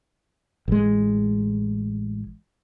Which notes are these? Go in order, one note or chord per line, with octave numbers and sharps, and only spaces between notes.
A1 G#3